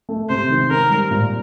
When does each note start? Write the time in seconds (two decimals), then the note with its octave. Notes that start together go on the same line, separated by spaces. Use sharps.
0.09 A3
0.29 C3 C5
0.50 D#3
0.70 C4 A#4
0.90 G3
1.11 A#2